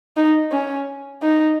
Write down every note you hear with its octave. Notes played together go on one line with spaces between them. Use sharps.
D#4
C#4
D#4